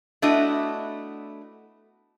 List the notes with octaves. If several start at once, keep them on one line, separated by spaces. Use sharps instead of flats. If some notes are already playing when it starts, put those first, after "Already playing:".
A3 B3 D4 E4 F#4 D#5